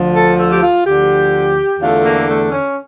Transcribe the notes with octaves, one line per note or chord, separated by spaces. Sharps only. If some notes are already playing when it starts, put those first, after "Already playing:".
Already playing: D2 D3 F3
A4
A4
G4
F4
D2 D3 F3 G4
E2 D3 A3 F4
A#3
A3
C#4